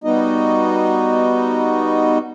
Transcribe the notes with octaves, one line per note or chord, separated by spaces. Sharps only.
G3 B3 D#4 F#4 D#5